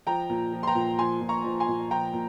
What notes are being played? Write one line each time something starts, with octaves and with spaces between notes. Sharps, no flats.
F3 G5 A#5
A#2
F3
C6
G5 A#5
A#2
F3 G#5 C6
A#2
A#5 C#6
F3
G#5 C6
A#2
F3 G5 A#5
A#2